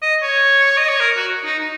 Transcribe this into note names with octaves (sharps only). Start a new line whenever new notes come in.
D#5
C#5
D#5
C#5
A#4
F#4
D#4
D#4